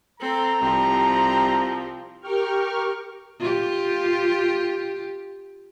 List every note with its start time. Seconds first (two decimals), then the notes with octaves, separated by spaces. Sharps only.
0.20 C4 A4 A#5
0.62 C2 F3 C4 G4
2.20 G4 A#4 G5 C#6 F6
3.40 F4 G4